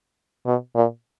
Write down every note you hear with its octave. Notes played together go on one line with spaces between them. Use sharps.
B2
A#2